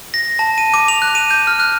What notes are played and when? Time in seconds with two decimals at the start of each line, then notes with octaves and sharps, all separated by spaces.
0.14 A#6
0.39 A5
0.58 D#7
0.74 D6
0.88 F7
1.02 F#6
1.15 D#7
1.31 G6
1.47 F6
1.60 F#6